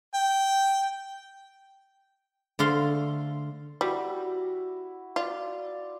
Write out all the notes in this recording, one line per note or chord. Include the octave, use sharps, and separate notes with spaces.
G5
D3 A3 F5 C6
G3 E4 F#4
F4 D5